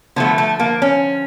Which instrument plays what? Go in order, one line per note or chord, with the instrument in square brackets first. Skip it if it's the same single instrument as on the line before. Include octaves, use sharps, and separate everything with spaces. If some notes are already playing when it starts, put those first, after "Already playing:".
[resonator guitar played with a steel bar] D3 F3 A3 B3
A3
A#3
C#4